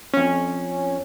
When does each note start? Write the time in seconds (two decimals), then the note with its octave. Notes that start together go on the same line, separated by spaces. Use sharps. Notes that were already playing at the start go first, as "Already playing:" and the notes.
0.14 F2 C#4